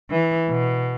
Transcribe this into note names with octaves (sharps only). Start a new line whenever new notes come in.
E3
B2